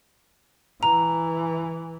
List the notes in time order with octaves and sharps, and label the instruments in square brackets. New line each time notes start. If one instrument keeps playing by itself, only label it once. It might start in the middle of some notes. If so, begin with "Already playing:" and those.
[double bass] E3 [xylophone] A#5